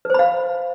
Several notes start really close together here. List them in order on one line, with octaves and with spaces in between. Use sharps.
B4 C5 B5 F5